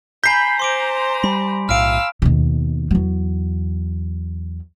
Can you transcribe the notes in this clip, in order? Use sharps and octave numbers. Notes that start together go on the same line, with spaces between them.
G#5 A#5 B5 G6 B6 C7
C5 A#5 C6 D6 D7
G3 B5
B1 A2 F5 E6 F6 D7
D#2 B2
E2 F#3